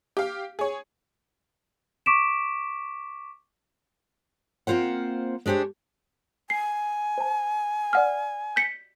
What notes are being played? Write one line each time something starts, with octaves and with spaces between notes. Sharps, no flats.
G4 F5
G#4 C#5
C#6 D6 B6 D7 E7
A#3 C4 F4 C5 F#5
G#3 D4 G4 C5 C#5
G#5 C7
C5 A5
D5 F#5 F6
G6 B6 C#7